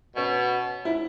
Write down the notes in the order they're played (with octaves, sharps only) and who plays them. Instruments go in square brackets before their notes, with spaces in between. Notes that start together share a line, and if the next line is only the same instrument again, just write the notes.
[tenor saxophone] B2 [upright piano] C#4
[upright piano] E4